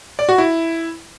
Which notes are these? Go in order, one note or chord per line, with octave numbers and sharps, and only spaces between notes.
D5
F#4
E4